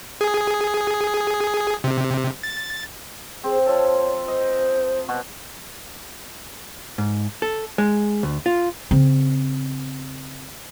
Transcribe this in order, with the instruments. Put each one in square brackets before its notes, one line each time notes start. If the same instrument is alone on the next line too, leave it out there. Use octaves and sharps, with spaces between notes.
[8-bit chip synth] G#4
C3
A6
[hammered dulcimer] C4 [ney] G#4
[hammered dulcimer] F3 A4 [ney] C#5
[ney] C5 [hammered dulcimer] D#5
[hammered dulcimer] B2 F#4
[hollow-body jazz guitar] G#2
A4
G#3
D2
F4
[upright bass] C#3 C4